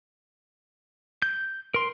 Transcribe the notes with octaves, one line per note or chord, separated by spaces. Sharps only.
G6
A#4 C6